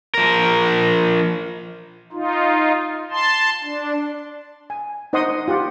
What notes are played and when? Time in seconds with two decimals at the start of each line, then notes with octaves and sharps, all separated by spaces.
0.15 F3 A#4
2.13 D#4 F4
3.11 A5 C6
3.63 D4
4.70 G#5
5.13 D#4 C5 D#5 F#5 C6 D#6
5.48 F4 G4 F#5